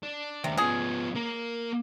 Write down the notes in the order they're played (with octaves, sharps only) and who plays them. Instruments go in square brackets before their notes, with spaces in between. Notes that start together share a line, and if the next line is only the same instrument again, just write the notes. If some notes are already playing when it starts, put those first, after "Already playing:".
[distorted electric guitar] D4
[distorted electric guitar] D#2 D4 [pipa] C3
[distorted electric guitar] F3 B3 [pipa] C#4 G#4
[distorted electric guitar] A#3 A#4